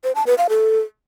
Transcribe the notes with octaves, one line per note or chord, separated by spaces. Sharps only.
C5
A5
B4
F5
A4